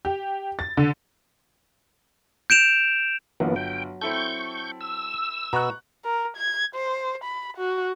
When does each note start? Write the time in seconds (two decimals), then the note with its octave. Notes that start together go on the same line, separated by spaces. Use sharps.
0.05 G4
0.59 A6
0.77 D3
2.50 G6 D7 E7 F7
3.40 G1 E3 F#3 A#3 B3 F4
3.56 G5
4.01 C4 E4 A4 C#6 G6
4.81 E6
5.53 B2 B3 A#5 C#6 F#6
6.04 A#4
6.37 G#6
6.75 C5
7.24 B5
7.57 F#4